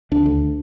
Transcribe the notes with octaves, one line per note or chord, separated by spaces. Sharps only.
D2 D4
D2